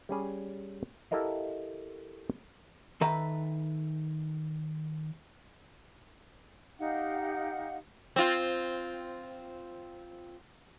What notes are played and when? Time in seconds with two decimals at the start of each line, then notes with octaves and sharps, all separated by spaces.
0.09 G3 C#4 G#4
1.11 E4 G4 A4 A#4 D#5 F5
3.01 D#3 A4 B4 E5 A#5
6.79 D#4 G4 F5 F#5
8.16 C4 F4